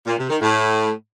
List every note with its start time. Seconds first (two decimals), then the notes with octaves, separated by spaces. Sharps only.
0.07 A#2
0.18 C3
0.30 D#3
0.41 A2